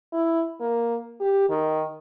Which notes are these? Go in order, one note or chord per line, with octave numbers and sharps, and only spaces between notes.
E4
A#3
G4
D#3